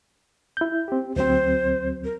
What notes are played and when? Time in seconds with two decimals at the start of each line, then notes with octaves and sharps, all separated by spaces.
0.57 E4 G6
0.88 C4 G4
1.16 D2 F#3 C4 C5
2.04 A#4